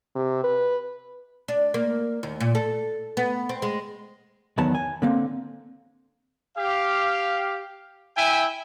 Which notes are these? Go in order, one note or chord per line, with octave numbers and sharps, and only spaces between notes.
C3
B4
D4
A#3
D#2
A#2
A4
B3
C4
G#3
E2 D#3 F#3 B3 A5
G#5
D3 A#3 C4
G4 F5
E4 E5 G5 G#5